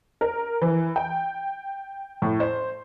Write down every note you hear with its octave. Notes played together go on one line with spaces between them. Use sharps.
A#4
E3
G5
A2
C5